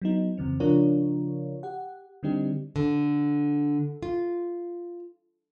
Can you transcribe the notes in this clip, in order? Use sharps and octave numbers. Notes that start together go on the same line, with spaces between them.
F#3 B3 D#4
F2 C#3 E3 C4
C#3 F3 D4 F4 A#4 C#5
G4 F#5
D3 G3 C4 D4 D#4 G4
D3
F4